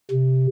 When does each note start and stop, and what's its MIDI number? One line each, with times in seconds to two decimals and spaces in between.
0.11 0.47 48